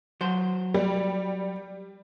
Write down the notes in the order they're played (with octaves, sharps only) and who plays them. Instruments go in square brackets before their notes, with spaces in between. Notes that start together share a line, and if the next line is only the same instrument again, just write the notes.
[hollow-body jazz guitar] F#3 C5
[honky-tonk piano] G3